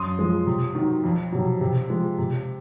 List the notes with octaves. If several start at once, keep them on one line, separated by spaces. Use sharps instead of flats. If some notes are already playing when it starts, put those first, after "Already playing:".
Already playing: F#2 C6 D#6
F3 G#3
C3
D#3 F#3
F2
C3 F#3
C3
F3 G#3
C3